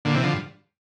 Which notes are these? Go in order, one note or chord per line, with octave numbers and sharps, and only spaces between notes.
A#2 D3
C3 E3
D3 F3
G2